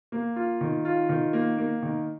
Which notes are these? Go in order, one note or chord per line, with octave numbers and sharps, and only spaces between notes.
A#3
F4
D#3
F4
D#3
A#3
A#3
D#3